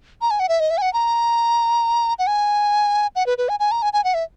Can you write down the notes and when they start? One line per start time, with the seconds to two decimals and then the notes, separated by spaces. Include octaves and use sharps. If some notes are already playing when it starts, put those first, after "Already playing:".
0.21 A#5
0.31 G#5
0.40 F#5
0.49 E5
0.60 D#5
0.71 E5
0.78 G#5
0.82 F#5
0.93 A#5
2.19 F#5
2.27 G#5
3.16 F#5
3.26 B4
3.38 B4
3.49 G#5
3.60 G#5
3.71 A#5
3.82 G#5
3.93 G#5
4.04 F#5
4.14 E5